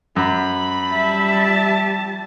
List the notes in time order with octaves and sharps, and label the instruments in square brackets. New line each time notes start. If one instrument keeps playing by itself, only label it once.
[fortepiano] F#2 [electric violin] B5
[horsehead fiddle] G3 A5 [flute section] E5